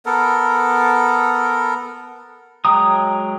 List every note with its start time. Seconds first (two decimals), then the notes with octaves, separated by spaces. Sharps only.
0.06 B3 A4 A#4
2.65 F#3 G#3 G5 A#5 D#6